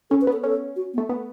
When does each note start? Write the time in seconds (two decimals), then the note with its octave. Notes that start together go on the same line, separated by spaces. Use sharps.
0.10 C#4 A4
0.21 B4
0.27 B3
0.32 A4
0.44 C#4 A4
0.76 F#4
0.93 B3
0.98 A3
1.09 B3